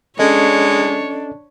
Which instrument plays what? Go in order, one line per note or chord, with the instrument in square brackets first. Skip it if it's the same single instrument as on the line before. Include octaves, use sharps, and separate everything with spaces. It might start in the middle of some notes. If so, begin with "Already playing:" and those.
[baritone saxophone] G#3 [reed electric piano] C#4 A4 D#5 [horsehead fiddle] D4 [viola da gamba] C#5